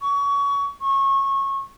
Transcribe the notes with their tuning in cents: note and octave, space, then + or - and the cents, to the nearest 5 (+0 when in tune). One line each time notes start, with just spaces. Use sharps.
C#6 +25
C#6 -25